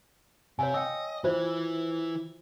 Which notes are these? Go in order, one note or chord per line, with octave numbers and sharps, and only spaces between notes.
C3 C#5 F5 G#5
D#5 G5 E6
E3 E4 F4 C5